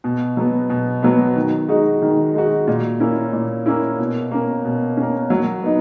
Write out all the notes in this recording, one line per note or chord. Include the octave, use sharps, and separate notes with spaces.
B2
F#3 B3
B2
F#3 B3
D#3
G#3 D#4 F#4
D#3
G#3 D#4 F#4
A#2
A#3 C#4 E4
A#2
A#3 C#4 E4
B2
A#3 C#4
B2
A#3 C#4
F#3
B3 D#4